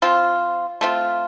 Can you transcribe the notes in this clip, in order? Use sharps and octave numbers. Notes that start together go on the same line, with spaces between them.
F3 C4 F4
A3 C4 F4